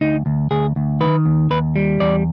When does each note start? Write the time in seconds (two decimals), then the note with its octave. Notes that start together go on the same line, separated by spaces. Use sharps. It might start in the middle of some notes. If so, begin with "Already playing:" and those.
0.01 D2 D#4
0.26 D2
0.51 D2 G#4
0.76 D2
1.01 D#3 B4
1.26 D#2
1.50 D#2 B4
1.76 G3
2.00 E2 D5